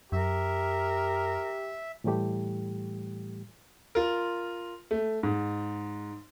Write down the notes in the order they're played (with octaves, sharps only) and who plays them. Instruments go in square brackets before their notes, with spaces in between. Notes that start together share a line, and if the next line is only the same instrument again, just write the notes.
[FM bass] F#2 [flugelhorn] G4 [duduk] A#4 [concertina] E5
[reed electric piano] A2 E3 G3 A3 G4
[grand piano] F4 A#4
A3
G#2